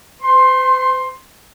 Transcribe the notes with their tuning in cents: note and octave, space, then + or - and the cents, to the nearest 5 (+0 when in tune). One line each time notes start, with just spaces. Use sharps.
C5 -40 C6 +15